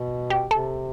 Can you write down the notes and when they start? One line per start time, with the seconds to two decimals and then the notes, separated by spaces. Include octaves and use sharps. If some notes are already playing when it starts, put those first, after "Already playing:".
Already playing: B2
0.30 G4
0.51 C3 A4